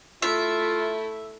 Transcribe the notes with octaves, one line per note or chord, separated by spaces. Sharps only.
A3 E4 F4 E5